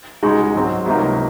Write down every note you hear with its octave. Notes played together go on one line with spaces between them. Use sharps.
C#2 C#3 G#3 D#4 F#4
G#2 F#3 C4
C#2 C3 F#3 A#3 D#4